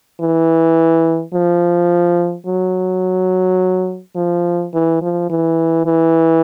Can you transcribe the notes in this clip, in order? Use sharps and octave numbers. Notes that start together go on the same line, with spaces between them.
E3
F3
F#3
F3
E3
F3
E3
E3